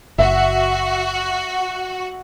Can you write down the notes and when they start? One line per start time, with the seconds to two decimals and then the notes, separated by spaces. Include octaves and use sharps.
0.18 F#1 F#4 E5